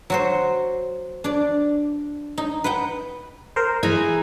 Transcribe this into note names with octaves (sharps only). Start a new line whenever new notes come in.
F#3 F#4 C5
D4 D5
D#4
B4 F#5 G5
A#4 C5
E3 G#4 A#5 G#6